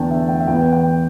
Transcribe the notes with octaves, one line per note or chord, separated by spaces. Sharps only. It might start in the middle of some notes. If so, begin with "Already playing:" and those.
Already playing: E2 D3 B3 D4 G5 A5
E5
G5
E5
E2 E3 B3 G5
G5